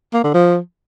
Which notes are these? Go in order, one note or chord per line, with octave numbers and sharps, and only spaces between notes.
A#3
D3
F3